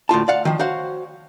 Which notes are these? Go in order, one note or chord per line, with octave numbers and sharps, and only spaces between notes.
D2 A2 F4 A5
D5 F5 F#5
D#3 F3
F#4 C5 C#5 F5 F#5